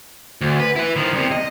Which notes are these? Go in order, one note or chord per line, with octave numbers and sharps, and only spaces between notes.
D2
B4
E4 B4
D#3 F3
C2 C3
D#5